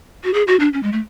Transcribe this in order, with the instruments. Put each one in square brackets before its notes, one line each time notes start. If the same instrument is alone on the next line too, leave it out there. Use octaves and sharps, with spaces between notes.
[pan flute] F#4
G#4
F#4
D4
C#4
G#3
A3